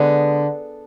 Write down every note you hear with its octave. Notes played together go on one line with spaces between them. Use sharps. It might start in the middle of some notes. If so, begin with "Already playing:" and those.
Already playing: D3 G#3 B3